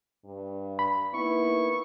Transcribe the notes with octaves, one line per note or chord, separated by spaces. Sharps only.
G2
B5
A#3 B3 D#4 E4 C#6